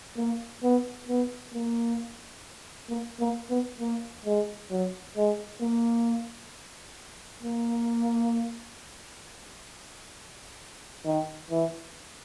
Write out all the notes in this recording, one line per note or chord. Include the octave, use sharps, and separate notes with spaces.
A#3
B3
B3
A#3
A#3
A#3
B3
A#3
G#3
F#3
G#3
A#3
A#3
D#3
E3